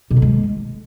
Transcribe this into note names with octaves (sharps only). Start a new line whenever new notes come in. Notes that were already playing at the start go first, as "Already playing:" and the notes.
B2
D3
G#3